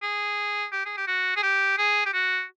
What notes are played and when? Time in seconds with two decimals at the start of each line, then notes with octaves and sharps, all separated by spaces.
0.03 G#4
0.72 G4
0.86 G#4
0.97 G4
1.07 F#4
1.37 G#4
1.43 G4
1.78 G#4
2.06 G4
2.13 F#4